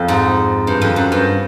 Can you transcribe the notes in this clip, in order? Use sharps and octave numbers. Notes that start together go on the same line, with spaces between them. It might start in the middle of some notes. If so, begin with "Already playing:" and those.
Already playing: F2
G#2
G2
F2
F#2
G2